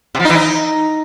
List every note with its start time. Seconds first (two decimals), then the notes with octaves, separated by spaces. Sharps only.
0.15 C3
0.20 F3
0.25 D#4
0.30 E3
0.35 D#4